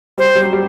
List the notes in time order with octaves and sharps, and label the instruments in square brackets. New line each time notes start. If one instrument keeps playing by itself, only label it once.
[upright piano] G3 [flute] C5
[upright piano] G3
F#3
G3